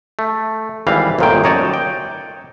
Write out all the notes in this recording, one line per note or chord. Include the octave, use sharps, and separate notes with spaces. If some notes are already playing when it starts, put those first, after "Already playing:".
A3
G#1 E3 G3 F5
G1 D2 A#2 D#3 A#3 G5
F#2 D#4 C#5 D5 A5
G5